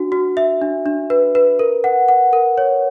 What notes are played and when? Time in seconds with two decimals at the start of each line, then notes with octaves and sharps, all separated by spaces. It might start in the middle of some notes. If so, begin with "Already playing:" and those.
Already playing: D4 F#4
0.12 F#4
0.37 E5
0.62 D4
0.86 D4
1.10 B4
1.35 B4
1.59 A#4
1.84 F#5
2.08 F#5
2.33 A#4
2.58 C#5